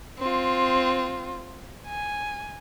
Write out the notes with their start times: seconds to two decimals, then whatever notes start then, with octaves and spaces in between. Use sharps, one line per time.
0.18 C4 F4
1.86 G#5